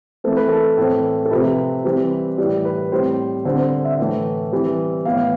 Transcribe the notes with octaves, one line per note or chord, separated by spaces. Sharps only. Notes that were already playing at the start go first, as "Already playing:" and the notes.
E3 A3 C4 A4
B4
A4
A2 E3 A3 C4
A4
C3 F3 C4 B4
E3 G3 C4
A2 E3 G3 D5
B4
A2 G3 C4 C5
D3 G3 C4 C5
C5
E5
A2 E3 A3
E3 G3 C4
A2 E3 B3 F5